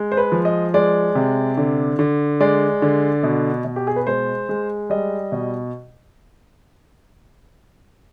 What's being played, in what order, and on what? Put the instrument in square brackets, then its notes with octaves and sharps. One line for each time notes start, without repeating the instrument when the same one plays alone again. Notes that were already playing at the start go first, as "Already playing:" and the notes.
Already playing: [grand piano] G#3
C5
B4
F3
D#5
G#3 D5
C3
D3
D3
G#3 D5
D3
B2
B2
G4
G#4
B4
G#3 C5
G#3
G3 D#5
B2